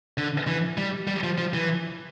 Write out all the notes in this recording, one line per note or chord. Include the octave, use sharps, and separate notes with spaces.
D3
E3
G3
G3
F3
F3
E3